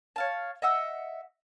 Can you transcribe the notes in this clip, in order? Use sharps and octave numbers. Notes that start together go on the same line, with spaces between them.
C#5 F5 A5
D#5 E5 F#5 E6